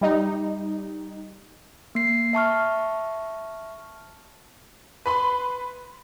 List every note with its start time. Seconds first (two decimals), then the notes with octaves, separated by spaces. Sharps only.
0.01 G3 D#4
1.95 A#3 C7
2.33 E5 A5 C#6 F6
5.06 B4 B5 C6